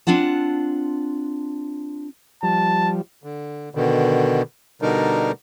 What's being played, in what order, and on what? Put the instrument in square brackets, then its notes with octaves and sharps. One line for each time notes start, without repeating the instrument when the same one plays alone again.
[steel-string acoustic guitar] C4 D4 F4 F#5 A5
[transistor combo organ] F3 G3 [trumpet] A5
[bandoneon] D3
B2 D3 D#3
B2 D3 G3 D4 D#4 A#4